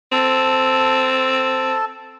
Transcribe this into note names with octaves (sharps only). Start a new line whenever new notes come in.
C4 A4 A5